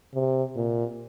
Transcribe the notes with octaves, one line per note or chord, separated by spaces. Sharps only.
C3
A#2